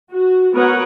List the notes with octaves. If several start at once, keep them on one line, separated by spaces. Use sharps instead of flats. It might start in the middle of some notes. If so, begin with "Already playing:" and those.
F#4
B3 F#4 A#4 B4 C#5 F#5